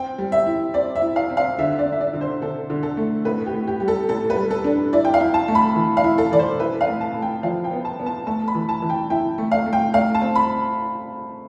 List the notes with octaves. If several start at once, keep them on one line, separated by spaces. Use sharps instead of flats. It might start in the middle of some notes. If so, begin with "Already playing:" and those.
Already playing: C4 G5
G3
E5
E4
C4 D5
E5
E4
F5
C4
F5
D3 E5
D5
D4
E5
D5
D3
C5
D3 A4
D3
A4
A3
A2 B4
G4
A2
G4
G3 G4
A4
A2 A4
B4
G3
A4
D4
E4 D5
G5
F5
E4
A5
A3
B5
E3
F5
E4
A4
E3 D5
C5
E4 B4
F5
A2
A5
A2
G5
F3 F5
G5
B3
A5
B3
A5
A3 A5
B5
E3
A5
E3
G5
E4 G5
A3
F5
A3
G5
A3 F5
A5
C4
B5